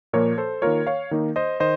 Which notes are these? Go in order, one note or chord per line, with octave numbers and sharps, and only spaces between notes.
A#2 F3 A#3 A#4 C#5
A4 C5
D#3 A#3 F4 A#4 C#5
C#5 F5
D#3 A#3 D#4
C5 D#5
D#3 C5 D#5